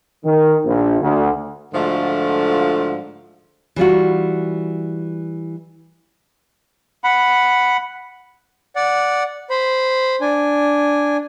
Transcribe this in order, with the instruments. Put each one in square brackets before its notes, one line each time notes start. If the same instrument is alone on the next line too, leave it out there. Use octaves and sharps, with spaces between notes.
[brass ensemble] D#3
A#1
D2
[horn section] G#2 D3 F3 A3 F4 F#4
[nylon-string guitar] E3 G3 F4 F#4
[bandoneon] F#5 B5
[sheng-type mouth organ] D5 F#5
C5 B5
D4 G#5